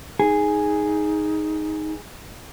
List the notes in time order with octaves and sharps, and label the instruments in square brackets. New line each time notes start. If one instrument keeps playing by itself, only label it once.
[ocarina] D#4 [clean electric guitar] G#4